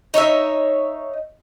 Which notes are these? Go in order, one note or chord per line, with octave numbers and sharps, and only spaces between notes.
D#4 C#5 D5 E5